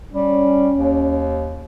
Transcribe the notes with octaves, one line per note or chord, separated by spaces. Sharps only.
G3 C#4
D#2